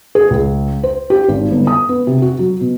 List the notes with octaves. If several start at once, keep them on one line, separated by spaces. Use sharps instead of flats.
G#4
C#2
C5
G4
G#1
G1
D#6
B3
C3
F#4
F#3
B2